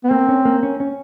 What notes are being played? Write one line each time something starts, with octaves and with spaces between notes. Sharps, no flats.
B3
A#3 C4
C#4
A#3
C#4
C#4